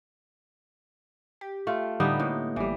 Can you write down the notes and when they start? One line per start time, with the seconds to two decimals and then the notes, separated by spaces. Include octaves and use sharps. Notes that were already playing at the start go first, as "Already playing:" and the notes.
1.41 G4
1.67 A3 F4
2.00 A2 D3 G3 B3 D#4
2.20 A2 A#3
2.56 G#1 E3 G3